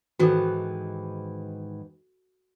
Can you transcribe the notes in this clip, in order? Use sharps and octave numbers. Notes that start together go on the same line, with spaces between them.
G#2 D#3 E3 F#4 A4